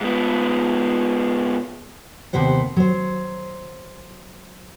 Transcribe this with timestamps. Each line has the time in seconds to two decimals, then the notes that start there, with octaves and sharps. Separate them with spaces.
0.01 G#2 B3
2.33 D#2 C3 B3 C5 F#5
2.76 F#3 C5